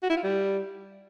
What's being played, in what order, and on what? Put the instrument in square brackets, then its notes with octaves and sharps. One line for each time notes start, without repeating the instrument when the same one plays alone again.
[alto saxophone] F#4
E4
F4
G3